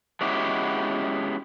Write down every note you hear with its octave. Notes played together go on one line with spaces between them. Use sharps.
G#3 B3 C#4 E4 F#4 G4